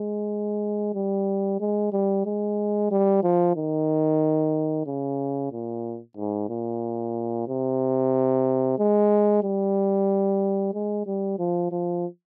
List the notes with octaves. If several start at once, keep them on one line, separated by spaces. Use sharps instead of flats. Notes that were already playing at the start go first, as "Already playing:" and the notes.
Already playing: G#3
G3
G#3
G3
G#3
G3
F3
D#3
C#3
A#2
G#2
A#2
C3
G#3
G3
G#3
G3
F3
F3